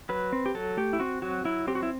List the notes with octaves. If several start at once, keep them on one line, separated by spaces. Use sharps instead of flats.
F#3 B4
C4
G4
F#3 A4
A3 G4
E4
C4 F#4
F#3 F#4
F#3 E4
C4 G4
F#4
E4